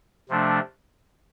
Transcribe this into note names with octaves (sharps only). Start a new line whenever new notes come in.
C3 F3 A3 D4